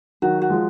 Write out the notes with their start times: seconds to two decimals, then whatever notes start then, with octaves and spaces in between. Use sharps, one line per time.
0.22 D#3 F#3 F#4
0.42 F#4
0.50 F3 G#3